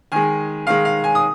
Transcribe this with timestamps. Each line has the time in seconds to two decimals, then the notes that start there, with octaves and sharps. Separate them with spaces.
0.12 D#3 G#3 G#5
0.67 D#3 G#3 F5
0.85 F5
1.04 G#5
1.15 D#6